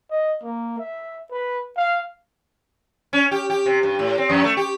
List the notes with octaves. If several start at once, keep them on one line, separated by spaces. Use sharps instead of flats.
D#5
A#3
E5
B4
F5
C#4
G4
G4
C3
G2
A2
C4
F2
A3
G4